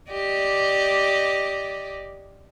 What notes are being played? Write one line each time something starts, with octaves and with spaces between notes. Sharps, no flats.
G4 D5 D#5